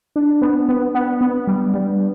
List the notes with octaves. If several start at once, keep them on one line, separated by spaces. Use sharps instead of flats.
D4
B3
B3
B3
B3
G3
G3